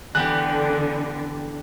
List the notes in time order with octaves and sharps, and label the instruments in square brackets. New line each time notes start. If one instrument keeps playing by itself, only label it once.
[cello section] D3 [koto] E3 B3 G4 [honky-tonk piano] F#6